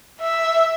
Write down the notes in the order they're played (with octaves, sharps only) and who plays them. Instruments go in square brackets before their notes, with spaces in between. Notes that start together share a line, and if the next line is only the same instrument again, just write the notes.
[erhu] E5